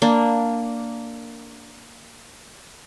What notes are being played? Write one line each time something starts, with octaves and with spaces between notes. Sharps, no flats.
A#3 D4